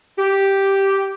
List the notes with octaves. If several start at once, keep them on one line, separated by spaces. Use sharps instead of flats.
G4